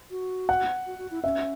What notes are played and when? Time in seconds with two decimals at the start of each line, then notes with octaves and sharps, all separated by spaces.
0.11 F#4
0.49 F#5
0.87 F#4
0.98 F#4
1.11 E4
1.24 C#4 E5